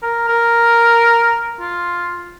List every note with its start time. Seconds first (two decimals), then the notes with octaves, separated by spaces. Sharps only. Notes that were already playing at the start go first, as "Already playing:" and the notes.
0.03 A#4
0.28 A#4
1.61 F4